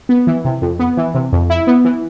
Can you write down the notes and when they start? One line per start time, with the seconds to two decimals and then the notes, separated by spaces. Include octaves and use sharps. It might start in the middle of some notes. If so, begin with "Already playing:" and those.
0.09 B3
0.27 E3
0.45 C3
0.62 F2
0.79 B3
0.97 E3
1.14 C3
1.32 F2
1.50 E4
1.67 B3
1.85 E3